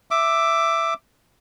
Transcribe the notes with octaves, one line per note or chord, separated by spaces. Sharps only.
E5 D6